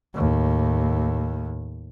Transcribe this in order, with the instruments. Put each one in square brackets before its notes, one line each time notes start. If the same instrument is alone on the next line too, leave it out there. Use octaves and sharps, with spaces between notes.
[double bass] D#2 A2